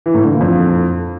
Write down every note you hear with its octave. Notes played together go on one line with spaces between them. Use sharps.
E3
A2
D3
A#2
F2